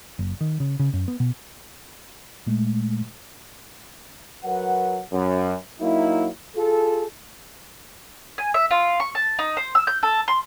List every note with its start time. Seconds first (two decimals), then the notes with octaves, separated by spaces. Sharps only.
0.19 F#1
0.41 D#3
0.60 C#3
0.80 C#3
0.94 F#2
1.08 B3
1.20 B2
2.47 A#2 G#3 A3
4.45 F#3 A#4 B4 F#5
5.12 F#2
5.80 F#3 A#3 D#4 E4
6.56 F4 G#4 A4
8.38 G#5
8.54 E5
8.71 F4
9.00 C#6
9.15 A5
9.39 D#4
9.57 C5
9.75 E6
9.87 G6
10.03 A4
10.28 C6